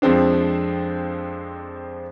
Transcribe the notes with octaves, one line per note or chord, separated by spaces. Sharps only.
F2 F3 G#3 C4 D4